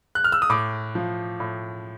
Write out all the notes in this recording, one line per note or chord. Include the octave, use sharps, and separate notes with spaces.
F#6
F6
E6
D#6
A2 D6
F3
A2